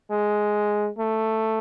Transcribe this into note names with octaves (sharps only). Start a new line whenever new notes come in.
G#3
A3